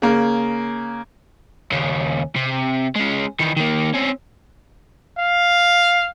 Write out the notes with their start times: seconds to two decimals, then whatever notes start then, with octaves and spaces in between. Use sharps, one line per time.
0.02 C#3 A#3
1.72 D#2 C#3
2.35 C3
2.96 G#3 C#4
3.40 D#3 E3
3.57 D#3 A#3
3.94 C4 C#4
5.19 F5